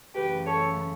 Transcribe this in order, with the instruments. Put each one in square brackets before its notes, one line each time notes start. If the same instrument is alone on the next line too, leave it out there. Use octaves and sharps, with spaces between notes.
[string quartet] F#2 C#3 E3 A3 G4 B4
A4 C#5